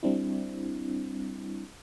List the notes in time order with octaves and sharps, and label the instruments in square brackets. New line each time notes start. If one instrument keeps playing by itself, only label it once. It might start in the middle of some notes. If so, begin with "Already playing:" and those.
[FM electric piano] G3 C4 D4 E4